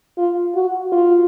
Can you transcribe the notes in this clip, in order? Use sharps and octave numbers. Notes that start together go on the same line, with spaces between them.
F4
F#4
F4